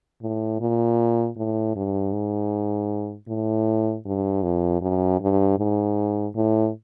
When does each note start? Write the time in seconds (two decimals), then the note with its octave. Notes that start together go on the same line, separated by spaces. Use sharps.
0.22 A2
0.60 A#2
1.37 A2
1.76 G2
2.13 G#2
3.28 A2
4.05 G2
4.43 F2
4.82 F#2
5.21 G2
5.59 G#2
6.35 A2